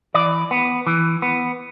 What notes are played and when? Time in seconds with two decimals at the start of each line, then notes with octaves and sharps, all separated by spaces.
0.14 E3 D5
0.51 B3
0.87 E3
1.22 B3